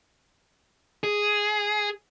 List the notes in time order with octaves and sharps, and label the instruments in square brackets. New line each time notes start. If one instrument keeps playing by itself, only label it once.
[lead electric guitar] G#4